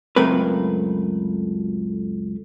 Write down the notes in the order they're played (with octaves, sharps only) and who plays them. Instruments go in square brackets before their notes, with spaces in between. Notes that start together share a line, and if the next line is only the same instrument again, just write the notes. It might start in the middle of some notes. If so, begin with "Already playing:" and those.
[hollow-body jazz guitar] C#2 F#2 A3 C4 A#4 B4